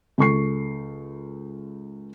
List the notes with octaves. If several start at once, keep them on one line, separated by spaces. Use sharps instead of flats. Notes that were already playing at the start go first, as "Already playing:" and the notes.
C#2 A4 C#6 C7